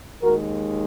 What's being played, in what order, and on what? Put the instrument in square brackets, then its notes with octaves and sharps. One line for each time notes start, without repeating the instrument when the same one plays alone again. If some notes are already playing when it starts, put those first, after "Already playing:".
[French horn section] D#2 D#3 G#3 F#4 A#4